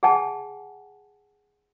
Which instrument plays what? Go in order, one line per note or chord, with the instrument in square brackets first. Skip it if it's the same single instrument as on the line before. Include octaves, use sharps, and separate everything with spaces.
[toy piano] G#4 F#5 G#5 A5